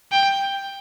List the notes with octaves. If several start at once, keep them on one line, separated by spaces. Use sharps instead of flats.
G5